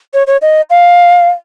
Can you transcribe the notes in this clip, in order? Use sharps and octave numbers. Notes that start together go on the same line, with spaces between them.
C#5
C#5
D#5
F5